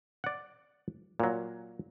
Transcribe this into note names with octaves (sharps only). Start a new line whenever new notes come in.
D5 F#5
A#2 F#3